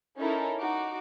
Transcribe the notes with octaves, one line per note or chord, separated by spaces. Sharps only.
C#4 D#4 E4 A4 A#4
D#4 F#4 D6